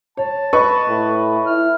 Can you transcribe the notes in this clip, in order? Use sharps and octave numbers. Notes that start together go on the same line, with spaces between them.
C#5 A5
B4 D#5 C#6
A2
E4 F6